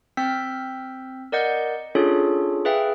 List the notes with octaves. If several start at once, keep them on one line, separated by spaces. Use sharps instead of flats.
C4 G5 E6 F6 G6 B6
A#4 D5 D#5 F#5 G6
C#4 D4 F4 G#4 A4 C#5
G#4 B4 E5 F5 G5